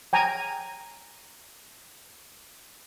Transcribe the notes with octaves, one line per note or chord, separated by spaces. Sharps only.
G5 G#5 A#5